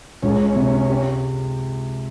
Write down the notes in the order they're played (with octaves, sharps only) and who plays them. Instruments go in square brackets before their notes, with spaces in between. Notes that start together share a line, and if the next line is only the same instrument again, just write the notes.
[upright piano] C#2 [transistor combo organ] C#4
[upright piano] C3
G4